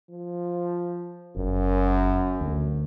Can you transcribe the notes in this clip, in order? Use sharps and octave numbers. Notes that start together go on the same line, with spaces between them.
F3
F#1 F#2
D2